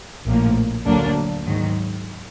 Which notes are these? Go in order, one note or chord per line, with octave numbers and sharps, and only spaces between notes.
A#1 A2 F3 A#3
D2 D3 F#3 A#3 D4
G#2 D#3 F#3